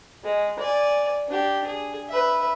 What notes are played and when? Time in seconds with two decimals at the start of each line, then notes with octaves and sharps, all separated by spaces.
0.24 G#3
0.59 D5 G#5
1.29 D4 G4
1.66 G#4
2.10 B4 E5